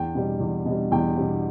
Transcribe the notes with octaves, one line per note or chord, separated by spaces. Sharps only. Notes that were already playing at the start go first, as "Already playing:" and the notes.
Already playing: E2 G5
B2 G3
E2
B2
G3
E2 G5
B2 G3